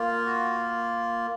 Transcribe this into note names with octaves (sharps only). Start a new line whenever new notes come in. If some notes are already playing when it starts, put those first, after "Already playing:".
Already playing: A#3 F4
F#4